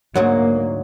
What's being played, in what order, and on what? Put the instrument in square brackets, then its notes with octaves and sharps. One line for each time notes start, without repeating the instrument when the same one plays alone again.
[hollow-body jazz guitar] D2 G#2 F#3 [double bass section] A#3